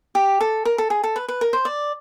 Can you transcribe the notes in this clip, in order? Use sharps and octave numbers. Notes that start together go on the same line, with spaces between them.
G4
A4
A#4
A4
G#4
A4
B4
B4
A#4
C5
D5